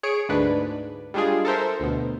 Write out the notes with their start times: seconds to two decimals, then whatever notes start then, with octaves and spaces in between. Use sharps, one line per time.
0.03 G#4 C#5 C#7 D7
0.29 D2 G#2 D4 B4
1.14 G3 G#3 D4 F4 G#4
1.45 A4 A#4 C5 E5
1.80 D2 B2